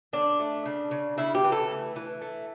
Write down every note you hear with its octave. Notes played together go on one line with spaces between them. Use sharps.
D3 D4
A3
C#3
C#3
C#3 E4
G4
E3
A4
A3
E3
A3